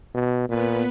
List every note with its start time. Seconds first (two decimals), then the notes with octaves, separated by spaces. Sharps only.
0.14 B2
0.49 A#2 B3 B4